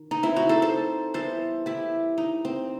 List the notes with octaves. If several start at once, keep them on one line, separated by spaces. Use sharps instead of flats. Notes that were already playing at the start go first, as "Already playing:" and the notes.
Already playing: D#3
D#4
C4 E4
D#4 F#4
A4 C5
A4 C5
E3 G3 B3 A4 C5
E4 G4
D#4
C4